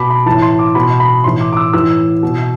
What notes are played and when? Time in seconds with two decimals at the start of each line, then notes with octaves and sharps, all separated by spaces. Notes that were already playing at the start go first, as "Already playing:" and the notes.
Already playing: B2 B5 D6
0.10 B5
0.26 A2 E3 A5
0.42 C6
0.59 D6
0.75 B2 B5
1.00 B5
1.24 A2 E3 C6
1.41 D6
1.53 D6
1.57 E6
1.74 A2 E3 E6
2.23 B2